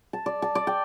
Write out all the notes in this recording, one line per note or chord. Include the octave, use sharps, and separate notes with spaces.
A5
D5
A5
D5
G5